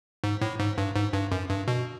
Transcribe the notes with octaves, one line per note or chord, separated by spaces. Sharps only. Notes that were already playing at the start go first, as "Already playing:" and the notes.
G#2
A2
G#2
G2
G#2
G2
F#2
G2
B2